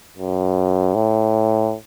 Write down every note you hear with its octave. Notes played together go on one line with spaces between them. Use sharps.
F#2
A2